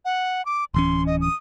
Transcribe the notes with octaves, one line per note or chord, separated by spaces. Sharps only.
F#5
D6
D1 E3 C#4 C6
D#5
D#6